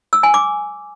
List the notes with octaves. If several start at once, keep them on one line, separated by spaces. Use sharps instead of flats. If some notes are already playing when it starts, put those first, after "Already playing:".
E6
G#5
D6